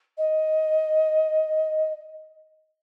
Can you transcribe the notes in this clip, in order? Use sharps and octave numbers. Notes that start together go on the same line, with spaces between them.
D#5